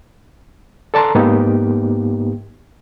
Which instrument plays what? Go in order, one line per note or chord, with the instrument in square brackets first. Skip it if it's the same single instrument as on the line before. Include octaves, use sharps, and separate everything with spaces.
[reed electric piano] A4 D5 A5 A#5 C6
G#2 A#3 B3 D#4 G4